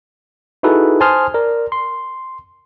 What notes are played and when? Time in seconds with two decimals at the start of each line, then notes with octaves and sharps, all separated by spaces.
0.63 D#4 E4 F#4 G#4 A4 B4
1.00 C5 G#5 A5 C6 D#6 F6
1.34 A#4 D5
1.72 C6